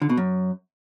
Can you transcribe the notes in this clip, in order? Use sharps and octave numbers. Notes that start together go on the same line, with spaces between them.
D3
B2
F#2